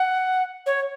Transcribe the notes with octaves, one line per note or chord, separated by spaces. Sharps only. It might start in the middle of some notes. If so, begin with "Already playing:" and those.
Already playing: F#5
C#5